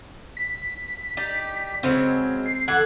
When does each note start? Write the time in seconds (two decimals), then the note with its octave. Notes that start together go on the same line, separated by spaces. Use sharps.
0.37 B6
1.17 D#4 G4 D5
1.83 C#3 F#3 G#3 C4
2.46 C7
2.68 E3 A4 F#5 F#6 G#6